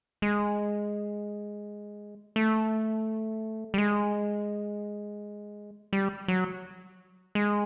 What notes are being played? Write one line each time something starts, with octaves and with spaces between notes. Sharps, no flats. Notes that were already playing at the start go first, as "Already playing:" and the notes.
G#3
A3
G3
G#3
G3
F#3
G#3